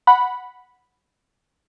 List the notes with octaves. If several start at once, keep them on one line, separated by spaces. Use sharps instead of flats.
F#5 B5